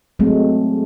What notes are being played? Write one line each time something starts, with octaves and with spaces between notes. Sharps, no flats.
F#3 G#3 A3 C4